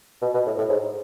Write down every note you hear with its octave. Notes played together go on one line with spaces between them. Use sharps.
B2
B2
A2
A2
G#2